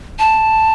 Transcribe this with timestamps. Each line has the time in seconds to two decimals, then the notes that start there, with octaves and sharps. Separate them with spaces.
0.19 A5